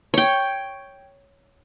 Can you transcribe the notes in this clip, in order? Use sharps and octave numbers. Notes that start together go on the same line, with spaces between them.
C#5 G5